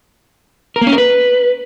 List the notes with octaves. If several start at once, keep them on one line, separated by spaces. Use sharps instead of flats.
A#4
A#3
C#4
A#4
B4